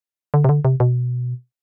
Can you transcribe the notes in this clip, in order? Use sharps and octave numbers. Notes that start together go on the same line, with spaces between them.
D3
C3
D3
C3
B2